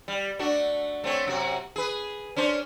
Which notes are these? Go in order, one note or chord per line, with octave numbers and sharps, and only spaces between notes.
G3
A3 D4 F#4
A3 C4 C#5
F#2 C3 F#4
G#4 B4
C#4 D4 C5